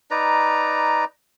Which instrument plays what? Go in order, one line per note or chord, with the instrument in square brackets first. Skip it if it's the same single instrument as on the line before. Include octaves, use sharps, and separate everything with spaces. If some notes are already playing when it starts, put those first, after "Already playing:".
[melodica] D#4 B4 D5 A#5